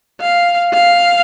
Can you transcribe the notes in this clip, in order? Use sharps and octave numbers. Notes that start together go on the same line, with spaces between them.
F5
F5